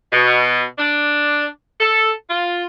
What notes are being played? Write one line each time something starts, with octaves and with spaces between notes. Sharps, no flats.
B2
D4
A4
F4